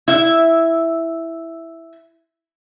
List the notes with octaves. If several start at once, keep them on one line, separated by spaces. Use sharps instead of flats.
E4 E5